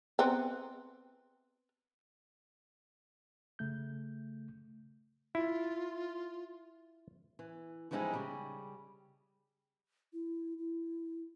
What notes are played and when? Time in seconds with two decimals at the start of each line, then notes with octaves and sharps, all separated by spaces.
0.19 B3 C4
3.59 C#3 A3 G6
5.35 E4 F4
7.39 E3
7.91 E3 F3 G3 G#3 D#4 E4
8.13 C#3 G3
10.13 E4
10.59 E4